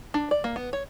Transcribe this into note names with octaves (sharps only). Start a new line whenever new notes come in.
D4
D5
A#3
B3
C#5